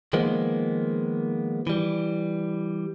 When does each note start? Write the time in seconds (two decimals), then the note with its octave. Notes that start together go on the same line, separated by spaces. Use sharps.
0.13 D#3 F3 G#3 A#3 B3
1.67 E3 G3